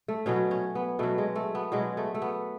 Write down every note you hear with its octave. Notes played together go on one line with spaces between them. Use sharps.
A3
B2 F#3 C#4
C#4
B3
B2 F#3 A3
G#3
A3
B3
B2 F#3 G#3
A3
A3
B3